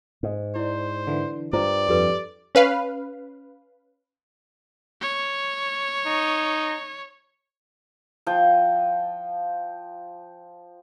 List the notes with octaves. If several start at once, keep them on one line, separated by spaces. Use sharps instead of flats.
G#2
E4 C5 D5
D3 E3
G2 F4 C5 D5 A#5
F2 G4 A4 B4
C#4 B4 F5
C#5
D#4
F3 G5